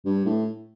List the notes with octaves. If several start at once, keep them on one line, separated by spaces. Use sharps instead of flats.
G2
A2